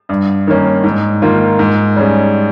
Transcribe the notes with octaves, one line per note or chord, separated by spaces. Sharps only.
G2
D#3 A#3 C#4
G#2
D#3 A#3 F4
G#2
G3 C#4 G#4